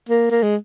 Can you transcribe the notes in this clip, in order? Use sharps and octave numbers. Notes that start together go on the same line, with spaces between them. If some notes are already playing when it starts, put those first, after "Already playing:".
A#3
A#3
G#3